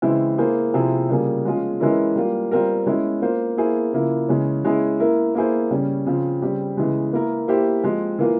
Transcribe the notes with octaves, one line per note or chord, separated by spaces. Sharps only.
C#3 E3 G#3 C4 E4
A#3 E4 G#4 C5
C3 F3 C4 E4 G#4
C#3 G3 A#3 F4 G#4
F3 G#3 C#4 F4 G#4
E3 G#3 C#4 E4 A#4
G3 A#3 F4
G3 C4 F4 A#4
G#3 C#4 E4
A#3 F4 C5
A#3 E4 G#4 C5
C#3 F3 A#3 E4
C#3 E3 G#3 C#4
G#3 C#4 E4 G#4
A#3 E4 A#4
A#3 E4 G#4 C5
C#3 G3 C#4
C#3 F3 C4 F4
C#3 G3 C4 G4
C#3 E3 G#3
A#3 E4 A#4
A#3 E4 G4 C5
F3 G#3 C4
E3 A#3 F4 A#4